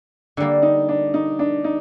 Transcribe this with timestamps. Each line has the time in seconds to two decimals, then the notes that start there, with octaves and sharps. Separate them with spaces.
0.37 D3 D4
0.40 G3 A#3
0.63 D#4
0.89 D4
1.14 D#4
1.39 D4
1.64 D#4